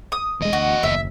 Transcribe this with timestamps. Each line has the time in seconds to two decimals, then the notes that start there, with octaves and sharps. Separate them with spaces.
0.12 D#6
0.41 E1 E2 G#3 D#5
0.53 D2 F#4
0.83 F#1 D#2 E5